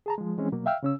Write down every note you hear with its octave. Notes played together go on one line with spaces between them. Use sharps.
G#4 A5 A#5
F3 G#3
E3 G#3 C4 C#4
B2 F#3 A#3
E5 F5 G5 E6 F6
C#3 C#4 E6